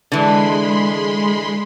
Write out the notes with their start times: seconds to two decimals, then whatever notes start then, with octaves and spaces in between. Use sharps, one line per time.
0.12 D3 E3 G#3 B5 C6